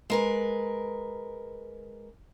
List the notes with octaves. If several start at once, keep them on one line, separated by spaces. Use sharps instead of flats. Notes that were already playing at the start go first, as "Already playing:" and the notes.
G#3 A#4 B4